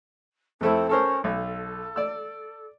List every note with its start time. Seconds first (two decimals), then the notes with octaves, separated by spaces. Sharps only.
0.61 F2 A3 C4 E4
0.89 C#4 A4 A#4 C5
1.24 B1 A4
1.96 D5 E6